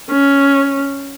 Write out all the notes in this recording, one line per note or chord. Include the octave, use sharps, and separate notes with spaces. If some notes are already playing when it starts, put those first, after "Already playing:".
C#4